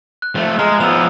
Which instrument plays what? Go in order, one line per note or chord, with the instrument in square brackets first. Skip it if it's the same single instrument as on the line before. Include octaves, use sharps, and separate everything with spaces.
[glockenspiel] F#6
[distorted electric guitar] F3 A3
[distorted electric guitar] G#3 [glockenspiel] A#5 F6
[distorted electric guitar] F3 B3 [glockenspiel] E6 F7